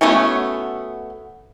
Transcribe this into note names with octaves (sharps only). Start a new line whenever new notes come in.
A3 B3 C#4 F#4 A4